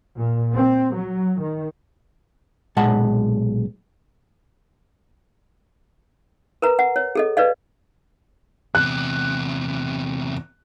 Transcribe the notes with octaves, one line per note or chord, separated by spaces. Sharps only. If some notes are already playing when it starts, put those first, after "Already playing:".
A#2
C4
F#3
D#3
B1 A#2 G#3 F#5 A5
A#4 B4 A#5
F#5
C#5
G#4 A4 D#5
B4 D5 D#5 F5
E2 C3 F#6